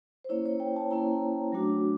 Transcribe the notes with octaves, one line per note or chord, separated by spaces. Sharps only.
C5
A#3 C#4 E4 C#5
C#5
G5
A5
A#3 C#4 E4 A#5
F#3 A3 D4 F#4